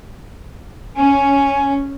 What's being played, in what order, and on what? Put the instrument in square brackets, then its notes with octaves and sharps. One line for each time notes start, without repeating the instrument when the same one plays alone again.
[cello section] C#4 [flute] G#5